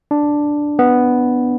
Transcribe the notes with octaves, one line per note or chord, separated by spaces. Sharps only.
D4
B3